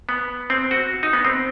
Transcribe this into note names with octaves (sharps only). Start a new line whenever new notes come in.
B3
C4
F#4
D#4
B3
C4